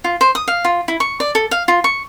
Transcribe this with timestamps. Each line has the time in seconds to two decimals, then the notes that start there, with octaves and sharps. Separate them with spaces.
0.04 F4
0.21 C5
0.35 D#6
0.48 F5
0.65 F4
0.88 E4
1.00 C#6
1.20 D5
1.35 A4
1.51 F5
1.68 F4
1.84 C#6